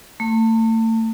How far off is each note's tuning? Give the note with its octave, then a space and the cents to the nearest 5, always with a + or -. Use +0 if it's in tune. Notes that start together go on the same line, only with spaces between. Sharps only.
A3 +35